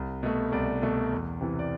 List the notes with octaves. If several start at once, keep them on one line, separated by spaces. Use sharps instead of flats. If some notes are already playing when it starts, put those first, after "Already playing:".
Already playing: C2
B2 A3
C2 D5
B2 A3
E2
C3 E3
D5